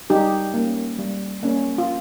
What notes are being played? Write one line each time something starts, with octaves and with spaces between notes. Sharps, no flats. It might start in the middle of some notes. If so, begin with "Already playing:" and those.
G3 D#4 G4
A#3 C#4
G3
A#3 C#4
F4